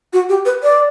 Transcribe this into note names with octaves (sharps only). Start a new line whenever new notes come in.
F#4
G4
B4
D5